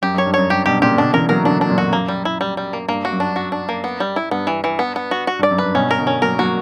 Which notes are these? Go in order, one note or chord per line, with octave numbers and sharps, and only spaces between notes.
F#2 G4
F#2
C#5
G2
F#2 C#5
G2 G4
G2 B2 G4
A#2 C#3 G4
B2 D3 D4
C#3 E3 A#4
F#3 A#3 A#4
D3 F#3 D4
D4
F#2 A#2
F#4
F#2 A#3
G3
E4
G3
G3
A#3
G2 A#3
F#4
F#2
D4
F#4
D4
A#3
B3
G3
E4
G2 B3
E3
E3
B3
B3
F#4
F#4
G2
D5
F#2
G2 B4
G2 B2 C#4
A#4
B2 D3
C#4
F#3 A#3 A#4
F#3 A#3 F#4